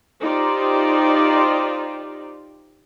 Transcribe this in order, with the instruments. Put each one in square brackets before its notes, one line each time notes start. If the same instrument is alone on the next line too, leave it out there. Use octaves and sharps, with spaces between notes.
[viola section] D#4 F4 G4 C5 D5